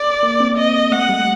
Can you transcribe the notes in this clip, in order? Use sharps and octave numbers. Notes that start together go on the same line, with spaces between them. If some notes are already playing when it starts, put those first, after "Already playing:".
Already playing: D5
A#3
C4
D#5
A3 F#5
G3